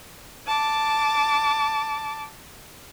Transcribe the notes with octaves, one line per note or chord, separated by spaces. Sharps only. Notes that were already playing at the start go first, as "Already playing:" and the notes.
A5 D6